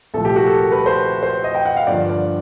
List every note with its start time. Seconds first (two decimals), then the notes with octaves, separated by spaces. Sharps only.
0.14 C2 A#2 F3 A3 A4
0.25 G4
0.36 F#4
0.46 A4
0.58 A#4
0.72 B4
0.86 C5
1.23 C5
1.44 D#5
1.55 G5
1.65 F#5
1.77 F5
1.87 G2 D3 F3 A#3 D5
2.09 D5